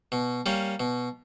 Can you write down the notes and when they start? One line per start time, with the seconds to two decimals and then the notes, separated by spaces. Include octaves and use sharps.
0.12 B2
0.46 G3 A#3 C#4
0.80 B2